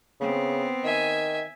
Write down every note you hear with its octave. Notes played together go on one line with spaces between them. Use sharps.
C#3 B3 C4
D#3 E5 G#5